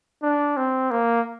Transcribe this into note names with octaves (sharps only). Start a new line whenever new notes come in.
D4
C4
A#3